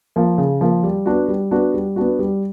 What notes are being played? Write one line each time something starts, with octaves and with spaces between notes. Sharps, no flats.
F3 A#3
C#3
F3 A#3
G3
B3 D4 F#4
G3
B3 D4 F#4
G3
B3 D4 F#4
G3